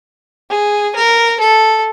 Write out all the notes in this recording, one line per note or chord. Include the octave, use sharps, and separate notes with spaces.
G#4
A#4
A4